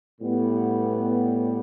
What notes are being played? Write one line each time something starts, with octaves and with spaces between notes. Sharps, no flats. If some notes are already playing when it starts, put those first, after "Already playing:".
A2 G3 B3